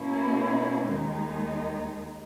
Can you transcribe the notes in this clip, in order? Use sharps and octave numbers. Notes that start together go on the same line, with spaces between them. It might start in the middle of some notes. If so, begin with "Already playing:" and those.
Already playing: B2 A#3 C#4 E4
D#2 D#3 G#3 D#4